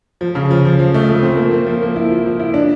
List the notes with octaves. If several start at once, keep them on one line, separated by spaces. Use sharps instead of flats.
F3
C#3
F3
F3
F3
A3
A3
C4
A#3
A#3
F3
A#3
E4
F3
F3
E4
D4